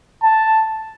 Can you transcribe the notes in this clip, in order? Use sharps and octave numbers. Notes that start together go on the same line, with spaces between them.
A5